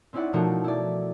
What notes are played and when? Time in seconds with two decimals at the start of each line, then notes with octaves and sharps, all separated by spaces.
0.13 C4 C#4 D#4 E4 D5 F#5
0.33 B2 F3 A3 D#4 F#4 A#4
0.64 E4 D5